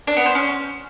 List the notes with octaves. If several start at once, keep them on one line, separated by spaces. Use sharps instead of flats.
D4
B3
C5
C#4